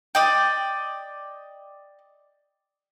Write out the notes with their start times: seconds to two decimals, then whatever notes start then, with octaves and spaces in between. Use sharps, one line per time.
0.15 D5 D#5 G5